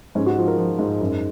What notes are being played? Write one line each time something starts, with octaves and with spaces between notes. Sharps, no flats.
G#2 C#4
F#4
F3 F4
A#4
F3
G#2
F#2